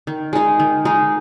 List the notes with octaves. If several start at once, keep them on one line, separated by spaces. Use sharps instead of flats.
D#3
G#3 D#4 G#4
D#3
G#3 D#4 G#4